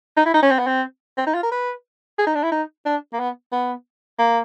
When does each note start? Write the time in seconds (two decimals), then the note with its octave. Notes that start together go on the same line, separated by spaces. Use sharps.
0.17 D#4
0.26 E4
0.34 D#4
0.43 C#4
0.51 C4
0.59 B3
0.67 C4
1.17 C4
1.26 D#4
1.34 F4
1.43 A#4
1.51 B4
2.18 G#4
2.27 D#4
2.35 D4
2.43 E4
2.52 D#4
2.86 D4
3.13 A#3
3.19 B3
3.52 B3
4.19 A#3